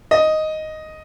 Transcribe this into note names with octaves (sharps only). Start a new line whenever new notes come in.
D#5